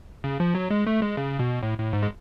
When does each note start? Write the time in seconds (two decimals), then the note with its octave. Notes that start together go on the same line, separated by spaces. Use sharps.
0.24 C#3
0.40 F3
0.55 F#3
0.70 G#3
0.87 A3
1.02 G#3
1.17 C#3
1.39 B2
1.63 A2
1.78 A2
1.93 G#2
2.03 G#3